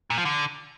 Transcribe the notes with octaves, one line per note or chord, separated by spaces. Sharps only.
A#2
F3
D3